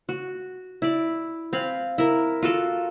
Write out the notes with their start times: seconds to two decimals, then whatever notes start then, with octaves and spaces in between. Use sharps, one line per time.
0.09 F#4
0.82 E4 D5
1.53 C4 F5 G#5 B5
1.98 E4 A#4
2.42 F4 F#4 A4 A#4